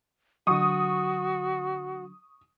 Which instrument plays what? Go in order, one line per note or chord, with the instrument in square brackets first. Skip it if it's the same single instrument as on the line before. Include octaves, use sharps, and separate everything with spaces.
[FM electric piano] D3 F#3 [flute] F#4 [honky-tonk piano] C#6 D#6